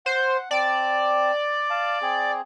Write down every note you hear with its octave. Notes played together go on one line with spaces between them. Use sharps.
C5 F#5
C4 D5 A5
F5 A5
C4 G#4